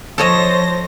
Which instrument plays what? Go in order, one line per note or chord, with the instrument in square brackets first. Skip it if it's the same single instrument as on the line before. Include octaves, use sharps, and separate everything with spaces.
[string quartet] F3 C5 A#6 [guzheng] A4 C#5 D#5